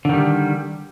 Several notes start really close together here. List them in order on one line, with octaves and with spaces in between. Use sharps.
D3 D#3 G3